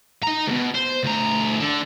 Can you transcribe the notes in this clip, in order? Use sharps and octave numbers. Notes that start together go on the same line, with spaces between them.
D#4 A#5
D2 B2
C5
D2 A#5
D3